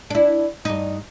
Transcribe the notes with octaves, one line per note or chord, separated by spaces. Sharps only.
D4 E4
G2 D#4